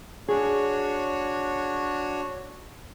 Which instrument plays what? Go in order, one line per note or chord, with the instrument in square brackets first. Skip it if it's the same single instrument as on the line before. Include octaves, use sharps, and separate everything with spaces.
[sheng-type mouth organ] D4 F#4 C#5 [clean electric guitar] G#4